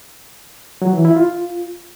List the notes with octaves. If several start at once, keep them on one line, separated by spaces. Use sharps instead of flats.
F#3
E3
E4
F4